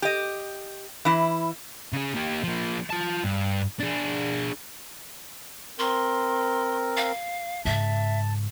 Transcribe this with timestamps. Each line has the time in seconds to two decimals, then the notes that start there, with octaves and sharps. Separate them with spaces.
0.02 G4 D#5
1.05 E3 E4
1.93 C#3 G#4
2.15 A#3 G4
2.44 F3 A#3
2.90 F4 A5
3.24 G2
3.80 D4 G#4
5.79 C4 A#4 C6
6.97 F5
7.65 G#2 C#3 E5 A5